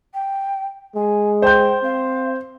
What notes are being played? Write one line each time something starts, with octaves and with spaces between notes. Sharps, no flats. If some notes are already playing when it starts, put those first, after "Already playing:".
G5
G#3 G#5
C5 G5 G6
C4 F5